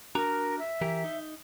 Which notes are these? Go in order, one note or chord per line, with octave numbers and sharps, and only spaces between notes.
D4 F#4 A#4 A#5
E5
E3 G4 A#4
D#4